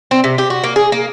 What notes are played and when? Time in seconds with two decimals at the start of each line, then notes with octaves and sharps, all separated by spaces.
0.11 C4
0.24 C3
0.38 G4
0.50 F#4
0.64 A#3
0.76 G#4
0.92 A#3